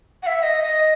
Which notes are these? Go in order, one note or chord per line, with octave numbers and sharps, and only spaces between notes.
F#5
E5
D#5
D#5